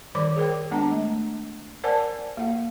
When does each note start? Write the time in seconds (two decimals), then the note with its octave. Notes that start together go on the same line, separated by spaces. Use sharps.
0.15 D#3 G3 C5 D5 B5 D6
0.36 G#4 A#4 C5 G5
0.71 G#3 B3 D4 F#5 A5 A#5
0.92 A3
1.84 A#4 C5 D5 F#5 G#5 A5
2.37 A#3 F#5